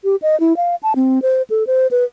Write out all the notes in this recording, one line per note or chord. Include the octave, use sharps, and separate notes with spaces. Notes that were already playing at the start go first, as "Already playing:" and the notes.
G4
D#5
E4
F5
A5
C4
C5
A4
C5
B4